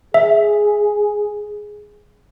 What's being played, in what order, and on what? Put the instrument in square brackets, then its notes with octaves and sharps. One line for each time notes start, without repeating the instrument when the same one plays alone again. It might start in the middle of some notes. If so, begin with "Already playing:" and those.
[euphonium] G#4 [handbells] E5